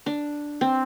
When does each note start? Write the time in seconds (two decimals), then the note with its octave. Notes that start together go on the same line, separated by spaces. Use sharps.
0.06 D4
0.61 C4